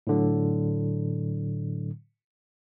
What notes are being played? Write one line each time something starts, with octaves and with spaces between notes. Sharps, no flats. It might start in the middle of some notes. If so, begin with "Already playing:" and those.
A2 D3 F#3